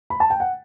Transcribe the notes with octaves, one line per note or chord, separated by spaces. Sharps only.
B5
A5
G5
F#5